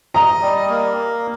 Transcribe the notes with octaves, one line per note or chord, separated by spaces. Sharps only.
D#5 A#5
G3
A#3